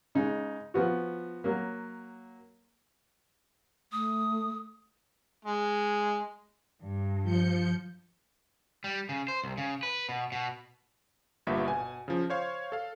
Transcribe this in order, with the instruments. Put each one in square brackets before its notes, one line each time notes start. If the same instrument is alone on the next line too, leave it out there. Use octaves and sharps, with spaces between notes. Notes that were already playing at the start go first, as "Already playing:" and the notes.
[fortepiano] C#3 G#3 D#4
F3 B3 F#4
F#3 A#3
[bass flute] A3 [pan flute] D#6
[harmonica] G#3
[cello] G2
[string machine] F3 G6 C#7
[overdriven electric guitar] G3
C#3
C5
C2
C#3
B4
B2
B2
[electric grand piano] G1 G2 A#2 B3 E5
B2 G#5
C#3 F3
C5 C#5 F5
A4 F5